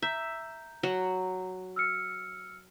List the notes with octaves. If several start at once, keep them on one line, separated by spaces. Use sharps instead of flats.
E5 A#5 G6
F#3 F#5
E6 F6 C#7